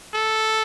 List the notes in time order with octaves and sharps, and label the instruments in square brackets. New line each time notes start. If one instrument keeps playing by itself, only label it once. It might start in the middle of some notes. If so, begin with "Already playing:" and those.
[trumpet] A4